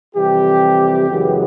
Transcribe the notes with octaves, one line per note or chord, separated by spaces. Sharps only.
F2 C3 E3 G3 G4
F#2 C#3 E3 G#3 B3